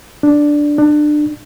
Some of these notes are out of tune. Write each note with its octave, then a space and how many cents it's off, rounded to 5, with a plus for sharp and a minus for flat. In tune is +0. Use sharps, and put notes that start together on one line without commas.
D4 +0
D4 +25